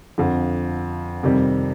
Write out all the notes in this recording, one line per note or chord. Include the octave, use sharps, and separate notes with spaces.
F2 D3 F3
F2 C3 D#3 G3